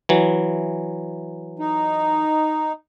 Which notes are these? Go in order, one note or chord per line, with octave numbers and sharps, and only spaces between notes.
E3 F#3
D#4